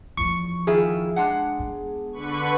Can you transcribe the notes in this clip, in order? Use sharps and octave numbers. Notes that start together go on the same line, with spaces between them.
E2 F3 C#6
D#3 E4 F4 G#4
G#3 D4 F#5
B3
D3 B4 C#6